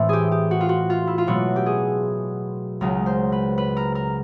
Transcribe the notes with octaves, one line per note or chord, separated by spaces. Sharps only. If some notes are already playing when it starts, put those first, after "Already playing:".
Already playing: A2 E3 A3 C4
G4 G#4
G4
F#4
F4
F#4
F4
E4
F4
B2 F#3 A3 F#4
G4
G#4
C#2 C#3 F#3 A#4
C5
B4
B4
A#4
A#4